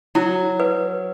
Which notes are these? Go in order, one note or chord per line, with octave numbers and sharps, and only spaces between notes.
F#3 E4
B4